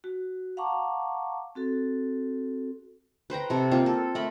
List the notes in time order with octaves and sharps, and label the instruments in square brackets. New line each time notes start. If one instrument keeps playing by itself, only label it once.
[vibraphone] F#4
F5 F#5 A5 A#5 C#6 D6
C4 F#4 A4
[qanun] B4 C5 G5 A#5
C3 A4
A#3 C4 F4
A4
A3 A#4 B5